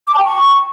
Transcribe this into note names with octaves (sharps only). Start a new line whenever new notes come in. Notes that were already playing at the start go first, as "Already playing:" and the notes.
D6
A5
G5
C#6